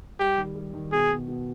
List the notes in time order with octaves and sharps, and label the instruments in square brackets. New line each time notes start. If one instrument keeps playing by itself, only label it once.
[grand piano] G3 [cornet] G4
[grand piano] D#3
G3
D#3
[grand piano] B2 [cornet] G#4
[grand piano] B2
B2